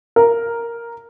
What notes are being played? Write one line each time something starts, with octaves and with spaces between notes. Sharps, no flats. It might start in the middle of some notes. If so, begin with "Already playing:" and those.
A#4